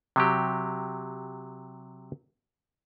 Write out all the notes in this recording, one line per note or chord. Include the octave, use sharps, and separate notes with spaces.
C3 F#3 G4